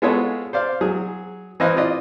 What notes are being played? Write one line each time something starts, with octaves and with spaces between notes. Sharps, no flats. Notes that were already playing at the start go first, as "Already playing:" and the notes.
G#3 B3 F4 G#4 A4 C#5
C5 D5 F5
F#3 G#4
E3 C4 D#5 F5 F#6
F4 D5 D#5